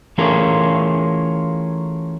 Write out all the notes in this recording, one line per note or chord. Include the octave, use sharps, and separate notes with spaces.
E3 A3 C#4 F4 G#4 A#4